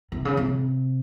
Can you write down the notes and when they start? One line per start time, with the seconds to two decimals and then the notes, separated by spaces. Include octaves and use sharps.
0.12 C3
0.25 C#3
0.37 C3